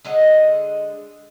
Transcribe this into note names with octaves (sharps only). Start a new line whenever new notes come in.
D3 G#3 D#5 F#5